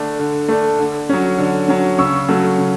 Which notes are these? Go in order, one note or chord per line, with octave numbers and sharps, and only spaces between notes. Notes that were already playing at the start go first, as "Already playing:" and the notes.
Already playing: D3 A3 D4
D3
A3 D4
D3
F#3 C#4
D3
F#3 C#4
C#3 C#6 E6
F#3 A3 C#4
C#3